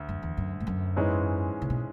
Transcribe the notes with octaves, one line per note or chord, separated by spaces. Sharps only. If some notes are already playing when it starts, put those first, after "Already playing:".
Already playing: D2
F#2
E2
F#2
G#2
F#2
G#2 E3 G#3 C#4
C#3
B2